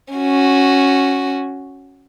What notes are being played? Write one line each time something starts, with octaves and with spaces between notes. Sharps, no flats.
C#4 F#4